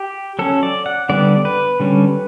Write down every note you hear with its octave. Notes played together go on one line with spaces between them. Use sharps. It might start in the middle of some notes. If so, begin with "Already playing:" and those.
Already playing: G4
F#3 C#4 A4
D5
F#5
D3 G3 B3 D5
B4
D3 G3 C#4